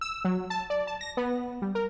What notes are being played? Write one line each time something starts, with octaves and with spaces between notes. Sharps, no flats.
E6
F#3
A5
D5
A5
A#6
B3
G3
A#4